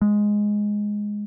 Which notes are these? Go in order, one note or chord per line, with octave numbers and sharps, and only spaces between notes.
G#3